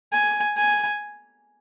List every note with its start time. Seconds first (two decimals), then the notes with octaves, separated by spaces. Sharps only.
0.12 G#5
0.56 G#5